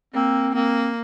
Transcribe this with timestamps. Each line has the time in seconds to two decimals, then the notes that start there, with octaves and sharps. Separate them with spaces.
0.14 A#3 C4
0.55 A#3 C4